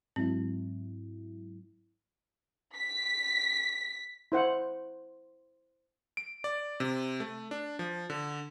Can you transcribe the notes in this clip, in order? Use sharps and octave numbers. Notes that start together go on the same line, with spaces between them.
G#2 F#3 C4 E4
B6
E4 C5 F#5
D7
D5
C3
A3
D4
F3
D3